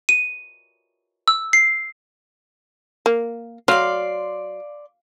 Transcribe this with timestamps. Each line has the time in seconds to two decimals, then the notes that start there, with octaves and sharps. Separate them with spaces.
0.09 D#7
1.28 E6
1.53 C7
3.06 A#3
3.68 F#3 D5 F5 C6